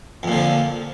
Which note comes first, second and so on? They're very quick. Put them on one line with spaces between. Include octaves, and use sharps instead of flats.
F2 A#2 D3 F3